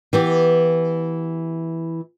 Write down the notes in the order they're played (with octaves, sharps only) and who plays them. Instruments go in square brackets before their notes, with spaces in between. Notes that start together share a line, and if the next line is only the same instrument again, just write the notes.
[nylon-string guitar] E3 B3 G4